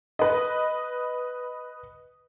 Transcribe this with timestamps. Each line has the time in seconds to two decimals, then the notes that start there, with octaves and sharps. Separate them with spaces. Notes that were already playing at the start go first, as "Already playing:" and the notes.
0.19 B4 D#5